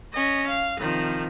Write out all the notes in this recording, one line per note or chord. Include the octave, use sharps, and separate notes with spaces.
C#4 D#5
F5
C3 D#3 F3